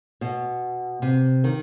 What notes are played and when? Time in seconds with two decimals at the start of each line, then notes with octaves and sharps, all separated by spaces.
0.21 B2
1.02 C3
1.44 D#3